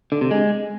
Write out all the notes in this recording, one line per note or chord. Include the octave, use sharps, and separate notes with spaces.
D3
C3
G#3